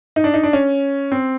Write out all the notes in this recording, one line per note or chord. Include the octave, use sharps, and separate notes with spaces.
D#4
D4
D#4
D4
C#4
C4